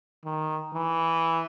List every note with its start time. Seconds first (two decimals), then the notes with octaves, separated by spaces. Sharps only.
0.25 D#3
0.74 E3